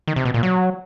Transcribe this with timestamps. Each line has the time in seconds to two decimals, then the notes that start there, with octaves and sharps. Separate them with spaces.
0.08 D#3
0.16 C3
0.25 B2
0.34 A#2
0.43 F#3